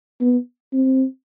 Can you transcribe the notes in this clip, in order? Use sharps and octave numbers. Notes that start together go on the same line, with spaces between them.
B3
C4